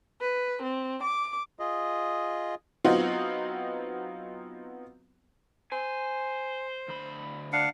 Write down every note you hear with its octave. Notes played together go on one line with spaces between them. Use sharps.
B4
C4
D6
F4 G#4 D#5
F#3 B3 C4 D#4 F4 F#4
C5 G#5
D2 B5
D4 F5 F#5